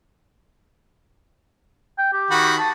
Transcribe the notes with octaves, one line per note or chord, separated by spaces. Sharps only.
G5
G4
D#3 F#4 B5
A5